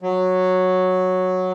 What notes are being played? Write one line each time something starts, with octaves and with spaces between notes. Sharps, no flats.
F#3